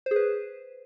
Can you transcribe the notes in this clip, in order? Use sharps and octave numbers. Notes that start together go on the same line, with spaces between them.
G#4 B4 C5